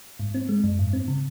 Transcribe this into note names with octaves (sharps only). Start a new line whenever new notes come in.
G#2
C4
G#3
F#2
G#2
C4
C#3